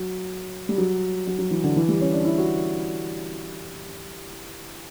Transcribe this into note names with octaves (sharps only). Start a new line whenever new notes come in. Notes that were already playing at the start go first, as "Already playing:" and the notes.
Already playing: F#3
G3
F#3
F#3
F#3
E3
D3
E3
G3
C#4
D4
E4
F#4